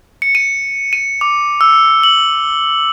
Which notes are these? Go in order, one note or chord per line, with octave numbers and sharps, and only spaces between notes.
C#7
D#7
D#7
D6
E6
F#7